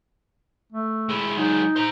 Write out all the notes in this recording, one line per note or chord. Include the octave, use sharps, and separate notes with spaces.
A3
G#3 E4
F#3 G#3 D#4
C5 A#5